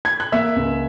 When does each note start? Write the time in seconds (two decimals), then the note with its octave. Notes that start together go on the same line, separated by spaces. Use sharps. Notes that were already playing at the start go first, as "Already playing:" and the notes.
0.05 G#6
0.20 F#6
0.32 A#3 E5 E6
0.56 C#2